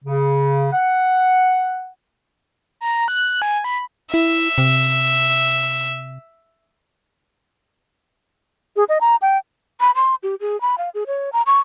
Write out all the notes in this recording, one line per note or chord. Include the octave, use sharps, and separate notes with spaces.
C#3
F#5
A#5
F#6
G#5
B5
E4 E5
C3
G#4
D#5
A#5
G5
B5
C6
G4
G#4
B5
F5
G#4
C#5
A#5
C#6